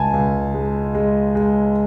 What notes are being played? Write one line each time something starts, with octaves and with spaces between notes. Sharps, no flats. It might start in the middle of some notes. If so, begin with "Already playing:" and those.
Already playing: C#2 G#5 A5
C#2
G#3
G#3
G#3